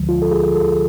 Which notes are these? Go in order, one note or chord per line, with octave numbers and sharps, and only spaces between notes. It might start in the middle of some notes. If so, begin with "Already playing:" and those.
Already playing: D2 D3 F3 G#3
F4
A4
G#4
A4